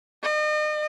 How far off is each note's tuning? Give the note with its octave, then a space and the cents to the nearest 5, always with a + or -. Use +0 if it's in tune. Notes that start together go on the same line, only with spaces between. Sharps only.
D#5 -40